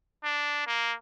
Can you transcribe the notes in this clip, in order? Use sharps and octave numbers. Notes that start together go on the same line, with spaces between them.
D4
A#3